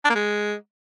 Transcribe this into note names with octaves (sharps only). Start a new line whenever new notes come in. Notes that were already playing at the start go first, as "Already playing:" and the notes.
D4
A#3
G#3